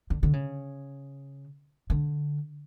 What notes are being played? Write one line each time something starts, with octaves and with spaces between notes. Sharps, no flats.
D3
D3
C#3
D3